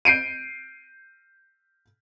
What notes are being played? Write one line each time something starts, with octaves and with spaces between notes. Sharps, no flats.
G6 C7 D7 D#7